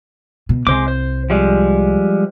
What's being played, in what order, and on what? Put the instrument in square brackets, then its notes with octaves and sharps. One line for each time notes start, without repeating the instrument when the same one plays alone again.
[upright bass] B2
[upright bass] C2 [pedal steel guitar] G#3 C5 D6
[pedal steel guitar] C5
F3 G3 G#3